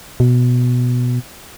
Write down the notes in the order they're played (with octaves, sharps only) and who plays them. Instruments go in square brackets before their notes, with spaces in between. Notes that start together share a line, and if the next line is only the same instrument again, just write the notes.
[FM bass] B2